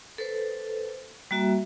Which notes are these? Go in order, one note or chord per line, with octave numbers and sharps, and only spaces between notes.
A4 B4 C5
G3 A#3 F#4 E5